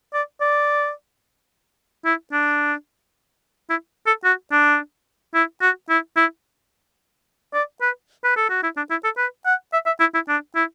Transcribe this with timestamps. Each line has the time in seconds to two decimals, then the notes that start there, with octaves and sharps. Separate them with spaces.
0.13 D5
0.41 D5
2.05 E4
2.32 D4
3.70 E4
4.07 A4
4.24 F#4
4.52 D4
5.34 E4
5.62 F#4
5.90 E4
6.17 E4
7.54 D5
7.81 B4
8.24 B4
8.36 A4
8.50 F#4
8.63 E4
8.77 D4
8.91 E4
9.04 A4
9.18 B4
9.46 F#5
9.73 E5
9.86 E5
10.00 E4
10.14 E4
10.29 D4
10.55 E4